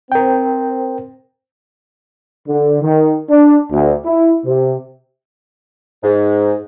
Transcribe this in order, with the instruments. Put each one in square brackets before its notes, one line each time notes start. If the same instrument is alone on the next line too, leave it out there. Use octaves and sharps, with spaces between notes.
[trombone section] C4 [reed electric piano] A#4 G5
[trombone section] D3
D#3
D4
D2
E4
C3
[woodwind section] G#2